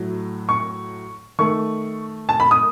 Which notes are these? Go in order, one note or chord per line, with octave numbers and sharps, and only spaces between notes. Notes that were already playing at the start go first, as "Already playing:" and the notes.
Already playing: A2 F#3 A3
C#6
D#3 A3 C#6
A5
B5
D#6